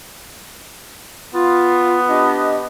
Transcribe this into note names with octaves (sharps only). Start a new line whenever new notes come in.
B3 F4
D4 G4 D#5